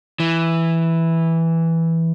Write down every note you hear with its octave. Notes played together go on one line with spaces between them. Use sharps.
E3